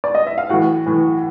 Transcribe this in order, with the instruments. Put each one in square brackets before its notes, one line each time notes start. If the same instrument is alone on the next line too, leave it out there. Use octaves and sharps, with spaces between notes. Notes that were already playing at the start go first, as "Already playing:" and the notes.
[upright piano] D5
D#5
E5
F5
A2 E3 F#4 F#5
A2 E3